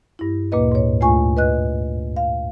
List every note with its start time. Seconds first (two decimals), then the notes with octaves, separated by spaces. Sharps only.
0.19 G2 E4
0.52 D2 A#2 A#3 B4 D#5
0.72 G#2 C#5
1.00 D2 A3 F4 G#5 C#6
1.37 B4 D#5 F#6
2.16 F5